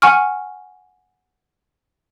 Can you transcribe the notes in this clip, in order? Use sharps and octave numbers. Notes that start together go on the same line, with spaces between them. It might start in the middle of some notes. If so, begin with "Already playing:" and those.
F#5 G#5 C#6 F6